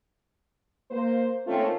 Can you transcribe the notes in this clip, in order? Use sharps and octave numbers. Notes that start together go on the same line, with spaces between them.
A#3 C5
D#3 A3 A#3 C4 C#4 F4